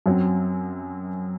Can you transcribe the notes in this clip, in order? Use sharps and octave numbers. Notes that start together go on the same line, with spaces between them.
F#2 F#3 C4